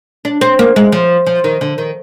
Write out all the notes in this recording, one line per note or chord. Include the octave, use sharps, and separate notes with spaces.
D4
C4
A#3
G#3
F3
F3
D#3
D3
D#3